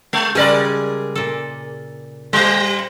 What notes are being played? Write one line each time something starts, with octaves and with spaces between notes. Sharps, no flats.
G#3
C#3 G3 G#3 G#4 A#4 D5
A#2 A4
G3 G4 C5